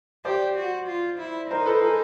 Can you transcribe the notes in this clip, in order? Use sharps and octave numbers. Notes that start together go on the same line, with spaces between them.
G4 C5 D5
F#4
F4
E4
D#4 A#4 C5
A4 B4
G#4 A#4